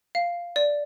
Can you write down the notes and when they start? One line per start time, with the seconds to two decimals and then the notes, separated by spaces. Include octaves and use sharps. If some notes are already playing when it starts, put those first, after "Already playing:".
0.15 F5
0.56 D5